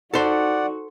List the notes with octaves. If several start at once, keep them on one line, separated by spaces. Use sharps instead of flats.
D#4 F#4 A4 C5 D5 F#5